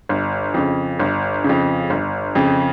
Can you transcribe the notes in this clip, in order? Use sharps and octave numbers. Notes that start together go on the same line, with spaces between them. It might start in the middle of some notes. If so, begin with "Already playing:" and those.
G1
F2 C#3
G1
C#3
F2
G1
F2 C#3